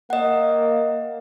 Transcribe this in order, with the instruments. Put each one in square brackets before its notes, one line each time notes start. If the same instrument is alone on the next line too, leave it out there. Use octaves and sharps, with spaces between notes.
[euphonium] A#3 [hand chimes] D#5 F#5